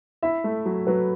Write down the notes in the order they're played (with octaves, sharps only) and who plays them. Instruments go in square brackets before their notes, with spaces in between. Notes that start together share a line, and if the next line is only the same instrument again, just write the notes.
[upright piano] E4 [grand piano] E5
[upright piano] A3
F#3
[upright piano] F#3 [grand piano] B4